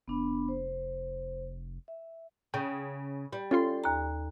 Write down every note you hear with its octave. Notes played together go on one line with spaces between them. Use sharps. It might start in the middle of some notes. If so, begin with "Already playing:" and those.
F1 B3 D4 B5
C5
E5
C#3 G5
G3
C#4 F4 A4 C6
D#2 A#5